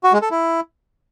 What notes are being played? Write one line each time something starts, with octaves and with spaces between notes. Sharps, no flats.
F#4
G#3
A4
E4